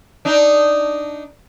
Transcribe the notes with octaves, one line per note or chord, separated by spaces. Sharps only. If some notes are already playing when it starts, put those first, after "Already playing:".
D4 D#4